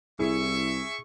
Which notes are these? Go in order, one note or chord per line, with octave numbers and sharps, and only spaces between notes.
C2 E4 G#4 E5 C#6